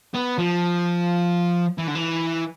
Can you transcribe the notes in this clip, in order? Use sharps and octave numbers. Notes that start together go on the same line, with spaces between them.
B3
F3
E3
D3
E3